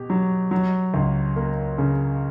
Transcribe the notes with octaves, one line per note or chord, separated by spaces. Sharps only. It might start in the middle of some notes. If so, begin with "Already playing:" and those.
Already playing: B2 G4
F#3
F#3
C#2
A#3
C#3